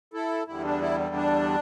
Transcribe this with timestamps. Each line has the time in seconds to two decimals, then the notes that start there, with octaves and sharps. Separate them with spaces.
0.13 E4 A4
0.47 E2 D3 G3 E4
0.64 D4
0.81 E4
1.15 D4